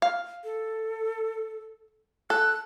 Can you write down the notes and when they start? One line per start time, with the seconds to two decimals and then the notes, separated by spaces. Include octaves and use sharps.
0.02 F5
0.44 A4
2.30 A4 F#6